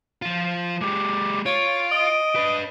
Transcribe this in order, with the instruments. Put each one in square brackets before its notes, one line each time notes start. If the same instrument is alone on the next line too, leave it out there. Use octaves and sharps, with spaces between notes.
[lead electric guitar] F3 F4
[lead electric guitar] G#3 G4 [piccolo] D6
[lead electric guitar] F4 [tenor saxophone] C#5 [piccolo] D7
[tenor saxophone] D#5
[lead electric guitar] D4 B4